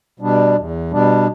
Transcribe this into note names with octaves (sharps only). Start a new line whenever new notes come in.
B2 G3 D4
E2
B2 G3 D4